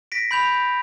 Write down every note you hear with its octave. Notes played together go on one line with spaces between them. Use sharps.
A#6 B6 D7
B5 G6 F7